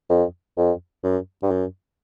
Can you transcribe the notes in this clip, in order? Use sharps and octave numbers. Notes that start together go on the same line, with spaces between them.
F2
F2
F#2
G2
F#2